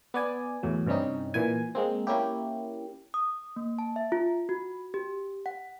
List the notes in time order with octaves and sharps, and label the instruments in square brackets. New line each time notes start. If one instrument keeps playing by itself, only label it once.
[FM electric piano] B3 D5 G#5
E2 A2 F#3
G2 C3 G3 C#4 D#4
A#2 E3 G#5
G#3 A#3 C4
A#3 C#4 E4 G4
[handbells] D#6
A#3
A5
E5
F4
F#4
G4
F#5